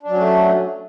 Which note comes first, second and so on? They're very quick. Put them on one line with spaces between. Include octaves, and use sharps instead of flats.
D4 F#3 C#4 A3